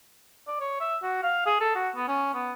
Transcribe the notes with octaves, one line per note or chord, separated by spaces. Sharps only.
D5
C#5
E5
F#4
F5
G#4
A4
F#4
B3
C#4
B3